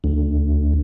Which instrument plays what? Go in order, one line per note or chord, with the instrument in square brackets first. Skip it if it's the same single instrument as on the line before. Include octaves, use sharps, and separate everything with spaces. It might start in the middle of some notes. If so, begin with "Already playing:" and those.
[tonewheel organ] D2